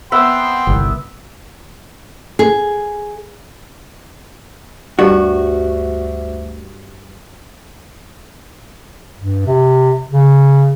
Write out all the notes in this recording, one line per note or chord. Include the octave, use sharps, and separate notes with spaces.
B3 E5 G5 C6
G1 C2
G#4
D2 G2 F#4
G2
C3
C#3